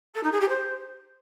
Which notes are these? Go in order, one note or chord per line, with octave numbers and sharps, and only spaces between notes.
A4
D#4
G#4
G4
C5